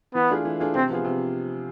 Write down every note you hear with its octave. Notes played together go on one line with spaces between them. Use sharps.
E3 B3
A3 D4 F4 G#4
E3
A3 D4 F4 G#4
C3 C4
F3 B3 F4 G#4
C3